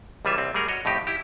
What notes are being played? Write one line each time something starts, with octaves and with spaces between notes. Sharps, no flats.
C#2 E3 G3 C#4 F4 E5
C2 C4
G3 A3 G#4 A#4 F#5
F#4 C#5 D#5
F2 A2 D#4 G4
E4 G4